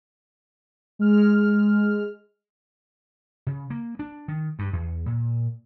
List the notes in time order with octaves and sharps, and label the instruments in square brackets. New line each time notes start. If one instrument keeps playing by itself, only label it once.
[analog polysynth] G#3 F6
[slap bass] C#3
A#3
D4
D#3
G2
E2
A#2